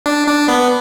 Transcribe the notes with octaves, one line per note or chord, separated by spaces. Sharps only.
D4
D4
B3